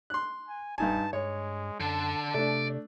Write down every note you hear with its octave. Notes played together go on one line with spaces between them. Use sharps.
C6 F#6
G#5
E1 G2 D#4 G#5 A5
G2 G#3 C#5
F#2 D3 A5
C3 A3 D4 D5